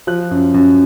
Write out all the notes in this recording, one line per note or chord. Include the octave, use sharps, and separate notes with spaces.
F3 F#6
F#2
F#2